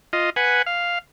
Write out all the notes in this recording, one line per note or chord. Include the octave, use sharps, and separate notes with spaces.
F4 D#5
B4 F#5 G#5
F5